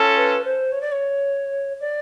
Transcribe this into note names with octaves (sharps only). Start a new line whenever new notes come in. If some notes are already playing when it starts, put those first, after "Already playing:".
Already playing: C#4 F4 A4
B4
C5
C#5
D5
C#5
D5